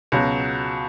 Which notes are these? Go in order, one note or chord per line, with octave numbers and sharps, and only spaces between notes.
C#2 B2 F#3